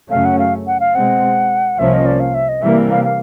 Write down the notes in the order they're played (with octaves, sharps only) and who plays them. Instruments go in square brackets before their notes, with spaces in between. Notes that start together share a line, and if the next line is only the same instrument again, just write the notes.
[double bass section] F#2 C#3 F#3 A3 C#4 [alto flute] F5
[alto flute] F#5
F5
F#5
F5
[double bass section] B2 G#3 C4 [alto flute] F#5
[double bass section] C2 C3 F3 A#3 C#4 [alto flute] E5
[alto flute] D#5
D5
F5
E5
D#5
[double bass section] C3 E3 G3 A#3 [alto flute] E5
[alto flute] F5
F5